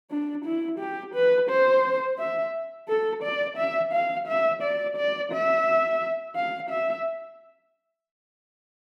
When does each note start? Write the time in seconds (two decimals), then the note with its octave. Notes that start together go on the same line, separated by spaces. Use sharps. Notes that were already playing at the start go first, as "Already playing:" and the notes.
0.11 D4
0.45 E4
0.79 G4
1.14 B4
1.49 C5
2.19 E5
2.89 A4
3.23 D5
3.57 E5
3.93 F5
4.28 E5
4.63 D5
4.97 D5
5.32 E5
6.36 F5
6.70 E5